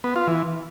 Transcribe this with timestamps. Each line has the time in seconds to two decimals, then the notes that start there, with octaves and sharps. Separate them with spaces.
0.04 B3
0.16 F4
0.27 E3